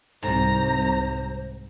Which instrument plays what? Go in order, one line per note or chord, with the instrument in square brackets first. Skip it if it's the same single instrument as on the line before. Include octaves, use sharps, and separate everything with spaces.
[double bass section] C2 C3 [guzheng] G#2 [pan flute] C5 [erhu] A#5